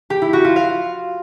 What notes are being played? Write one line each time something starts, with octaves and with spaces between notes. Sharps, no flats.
G4
E4
F#4
F4
F5